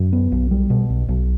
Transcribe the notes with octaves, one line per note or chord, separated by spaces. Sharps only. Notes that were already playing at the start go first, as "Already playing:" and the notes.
Already playing: F#2
B3
B1
G3
B2
B1
B1